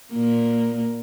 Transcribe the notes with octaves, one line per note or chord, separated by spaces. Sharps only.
A#2 A#3